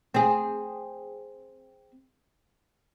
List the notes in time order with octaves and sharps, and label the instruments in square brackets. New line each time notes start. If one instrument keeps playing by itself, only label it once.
[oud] C4 G#4